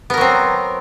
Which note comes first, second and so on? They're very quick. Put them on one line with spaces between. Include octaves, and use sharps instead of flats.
B3 A#4 F#3 C4